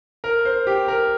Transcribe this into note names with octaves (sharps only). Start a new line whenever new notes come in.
A#4
C5
G4
A#4